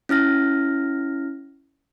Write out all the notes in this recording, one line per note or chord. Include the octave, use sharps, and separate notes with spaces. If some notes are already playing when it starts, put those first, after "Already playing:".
C#4 E4 F6 A#6